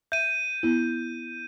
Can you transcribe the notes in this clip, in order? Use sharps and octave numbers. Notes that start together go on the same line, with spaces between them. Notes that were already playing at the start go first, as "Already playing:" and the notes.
E5 G6 D#7
B3 E4